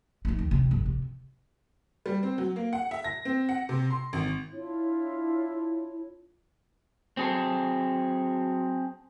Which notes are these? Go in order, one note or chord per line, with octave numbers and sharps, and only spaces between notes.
D4 D#4
D#2
C2 C3
G1
C3
G3
C4
F#3
A#3
F#5
E5
A#6
C4
F#5
C3
C6
G#1
D4 E4 F4 C#5
F#3 C4 G#4 A4